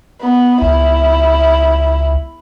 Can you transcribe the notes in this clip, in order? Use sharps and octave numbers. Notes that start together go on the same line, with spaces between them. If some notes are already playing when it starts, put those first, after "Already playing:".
B3
C#2 E4